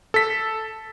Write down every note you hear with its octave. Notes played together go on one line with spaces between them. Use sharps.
A4 B6